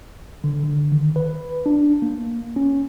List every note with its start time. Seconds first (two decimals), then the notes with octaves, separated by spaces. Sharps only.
0.44 D3
0.64 D3
0.92 D#3
1.16 B4
1.66 D4
2.02 A#3
2.56 C#4